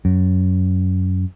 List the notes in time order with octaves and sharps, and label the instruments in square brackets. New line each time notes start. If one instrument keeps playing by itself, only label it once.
[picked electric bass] F#2